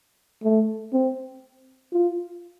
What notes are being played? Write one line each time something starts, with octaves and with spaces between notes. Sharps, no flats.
A3
C4
F4